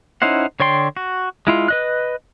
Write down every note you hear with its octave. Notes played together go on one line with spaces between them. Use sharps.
C#4 D#4 E4 C5 F#5
D3 C#5 D5 G5 C6
F#4
G#3 E4 F4
B4 D#5 F#6